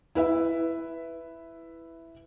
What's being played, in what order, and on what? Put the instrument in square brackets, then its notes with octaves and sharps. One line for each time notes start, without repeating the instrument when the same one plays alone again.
[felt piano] E4 B4 E5